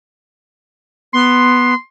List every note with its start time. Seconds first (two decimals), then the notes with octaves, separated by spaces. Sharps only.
1.13 B3 C6